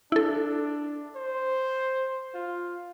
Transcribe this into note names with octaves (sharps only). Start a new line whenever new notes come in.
D4 E4 A4
C5
F4